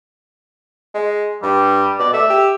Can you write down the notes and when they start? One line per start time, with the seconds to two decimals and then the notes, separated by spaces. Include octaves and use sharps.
0.94 G#3
1.43 G2 G3
1.99 B2 D5
2.13 A3 E5
2.30 G4